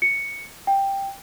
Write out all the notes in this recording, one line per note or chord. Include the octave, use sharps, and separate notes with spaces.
C#7
G5